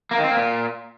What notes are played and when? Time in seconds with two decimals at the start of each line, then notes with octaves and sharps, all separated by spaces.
0.11 A#3
0.18 D#3
0.24 C4
0.30 A#3
0.37 A#2